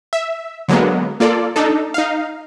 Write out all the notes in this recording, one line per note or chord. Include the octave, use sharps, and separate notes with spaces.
E5
D3 F#3 G#3 A#3 B3
A#3 F4 A4 D5
D4 D#4 A4
D#4 F5